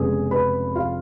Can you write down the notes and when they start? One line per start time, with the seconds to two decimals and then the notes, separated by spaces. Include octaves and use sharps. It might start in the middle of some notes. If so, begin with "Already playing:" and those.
Already playing: F1 F2 C#3 G#3 B3 G#4 G#5
0.31 B4 B5
0.75 F4 F5